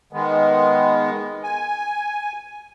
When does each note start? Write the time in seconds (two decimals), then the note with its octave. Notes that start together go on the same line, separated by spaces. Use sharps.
0.13 D#3 G#3 B3
1.44 G#5